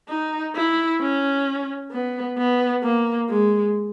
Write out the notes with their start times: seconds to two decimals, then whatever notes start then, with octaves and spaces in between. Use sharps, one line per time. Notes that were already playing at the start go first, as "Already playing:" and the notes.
0.09 D#4
0.55 E4
1.01 C#4
1.91 B3
2.38 B3
2.84 A#3
3.29 G#3